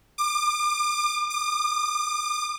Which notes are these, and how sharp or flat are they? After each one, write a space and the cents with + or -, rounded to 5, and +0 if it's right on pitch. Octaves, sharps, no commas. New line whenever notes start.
D6 +35
D6 +45